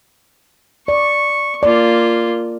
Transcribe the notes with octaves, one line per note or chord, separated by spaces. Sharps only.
D5 C#6
A#3 F4 D5